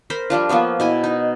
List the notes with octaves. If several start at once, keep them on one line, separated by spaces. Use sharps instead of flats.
A#4 C5 B5
F3 G3 D4 F4
F3 A#3 B3 C#5
B2 E4 G#5
D#4